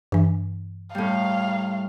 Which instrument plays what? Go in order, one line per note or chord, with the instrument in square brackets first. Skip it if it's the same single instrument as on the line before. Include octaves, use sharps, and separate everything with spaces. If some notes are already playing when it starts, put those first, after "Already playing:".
[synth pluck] G2 E3
[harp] A2 G3 [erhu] F5